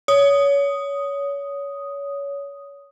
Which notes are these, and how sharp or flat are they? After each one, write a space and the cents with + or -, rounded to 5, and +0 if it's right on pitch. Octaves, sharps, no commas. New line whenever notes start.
C#5 +25 D#6 +0